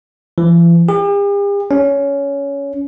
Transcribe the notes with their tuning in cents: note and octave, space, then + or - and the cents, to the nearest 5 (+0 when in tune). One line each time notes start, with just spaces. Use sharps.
E3 +45
G4 +45
C#4 +15